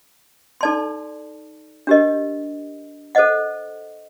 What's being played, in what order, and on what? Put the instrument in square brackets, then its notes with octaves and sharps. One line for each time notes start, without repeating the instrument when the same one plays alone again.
[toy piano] D#4 A4 D5 A5 C6
D4 G4 A#4 D#5
A4 C5 D#5 F#5